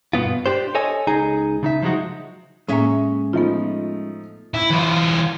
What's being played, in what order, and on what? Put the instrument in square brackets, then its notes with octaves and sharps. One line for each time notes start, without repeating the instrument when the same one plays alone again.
[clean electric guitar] G2 B2 B3 F4
D4 G4 C5
A4 C#5 D#5 G#5
C#2 D#4 G#4 G#5 A#5
C#3 D#4 E5
F3 F#3 G#3 D#4 F#4
[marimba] A2 A#3 [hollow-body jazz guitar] G#3 C#4 E5
[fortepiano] F3 A3 D#4 [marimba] B3 F4
[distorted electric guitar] E4
E3 F4